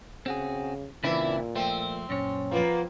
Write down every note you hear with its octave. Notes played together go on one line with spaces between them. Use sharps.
C#3 C4 F#4 G#4
A#2 C#3 E3 C4 D4 E4
F3 A3 C4
F#2 A#2 C#4 C#5
F3 A#3 B3 D5